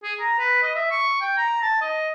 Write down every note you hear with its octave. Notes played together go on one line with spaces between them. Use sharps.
G#4
A#5
B4
D#5
E5
C#6
G5
A#5
A5
D#5